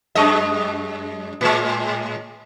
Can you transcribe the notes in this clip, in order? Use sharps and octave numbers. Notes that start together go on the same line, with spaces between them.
F#2 G#3 D#5
A2 G#3